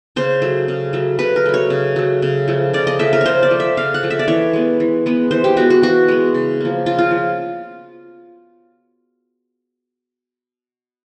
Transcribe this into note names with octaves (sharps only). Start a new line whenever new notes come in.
C#3 C5
F#3 A3
C#3
F#3 A3
C#3 B4
A#4
F#3 A3
C#5
C#3
F#3 A3
C#3
F3 A3
C#3 D5
D#5
F3 A3 E5
A#4
C#3 C5 C#5
D5
F3 A3
E5
C#3 F5
F#5
F3 A3
E5
D5
E3 C#5
G#3 B3
E3
G#3 B3
E3 C5
G4
G#3 B3 F#4
F#4
E3 F#4
G#3 B3
C#3
F3 A#3
C#3 F4
F4
F3